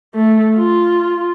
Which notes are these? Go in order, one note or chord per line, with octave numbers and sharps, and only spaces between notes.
A3
F4